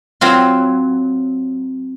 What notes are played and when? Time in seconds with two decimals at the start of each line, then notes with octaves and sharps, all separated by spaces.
0.21 F#3 C4 F4